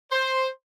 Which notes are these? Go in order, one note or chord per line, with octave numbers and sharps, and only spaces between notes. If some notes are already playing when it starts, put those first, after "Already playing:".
C5